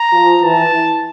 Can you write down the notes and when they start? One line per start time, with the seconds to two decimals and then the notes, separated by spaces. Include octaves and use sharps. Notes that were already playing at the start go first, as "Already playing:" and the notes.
Already playing: A#5
0.12 F3
0.42 E3 A5